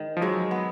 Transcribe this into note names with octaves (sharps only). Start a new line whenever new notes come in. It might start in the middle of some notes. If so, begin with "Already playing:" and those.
Already playing: G#2 D#3
F3
F#3 G#3
B3